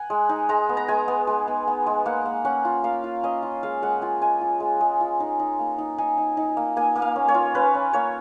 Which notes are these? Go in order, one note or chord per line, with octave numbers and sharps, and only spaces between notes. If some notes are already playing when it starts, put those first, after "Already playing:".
Already playing: F#5 G#5
G#3
D#4
G#3 A#5
B3
A#5
G#3 G#5
B3
G#3
B3
B3
G#3
A#3 F#5
A#3
C#4 F#5
F4
A#3 F5
F4
C#4 D#5
F4
G#3 F5
G#3 F#5
F4 G#5
G#3 G#5
F4
G#3
G#3
F4
D#4
D#4
A#3
D#4
D#4 G#5
D#4
D#4
A#3
A#3 G#5
A#3
F5
C#4
C#5
F4
C#4 B4
C#4
A#3 C#5